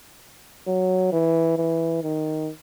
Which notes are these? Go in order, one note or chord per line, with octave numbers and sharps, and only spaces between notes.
F#3
E3
E3
D#3